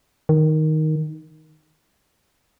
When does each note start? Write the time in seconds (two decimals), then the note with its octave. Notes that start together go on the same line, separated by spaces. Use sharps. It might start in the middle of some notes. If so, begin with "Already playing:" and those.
0.29 D#3